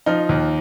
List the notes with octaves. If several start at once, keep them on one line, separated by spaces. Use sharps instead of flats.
F3 D#4
D#2